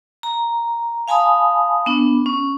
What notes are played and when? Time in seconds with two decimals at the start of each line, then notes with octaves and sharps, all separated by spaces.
0.23 A#5
1.08 F5 G#5 A5 B5 D#6
1.86 B3 D4
2.26 C#4